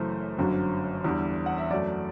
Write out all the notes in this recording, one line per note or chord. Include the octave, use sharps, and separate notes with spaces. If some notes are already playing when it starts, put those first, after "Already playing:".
Already playing: F#1 F#2 E3 A3 C5
G1 F#2 D3 F#3
E2 D3 G3
F#5
E5
F#2 F#3 A3 D5